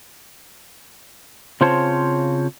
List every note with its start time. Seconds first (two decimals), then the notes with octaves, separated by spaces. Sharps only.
1.61 C#3 C4 F4 C5 C#5 A5